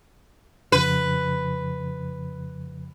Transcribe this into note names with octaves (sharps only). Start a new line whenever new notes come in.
F2 C#3 F3 B4